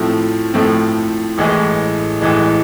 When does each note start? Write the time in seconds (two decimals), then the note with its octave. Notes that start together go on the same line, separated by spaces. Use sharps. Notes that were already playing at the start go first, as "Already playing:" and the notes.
Already playing: A2 F3 A3 C4
0.54 A2 F3 A3 C4
1.38 A1 A2 E3 G#3
2.21 A1 A2 E3 G#3